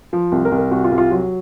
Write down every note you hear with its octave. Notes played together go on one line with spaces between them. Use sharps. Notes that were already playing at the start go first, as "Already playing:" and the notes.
F3
C2
A#4
C2
A#4
C2 F#4
F4
C2
F4
F#3